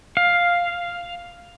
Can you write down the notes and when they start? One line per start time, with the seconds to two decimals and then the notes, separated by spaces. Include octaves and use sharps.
0.17 F5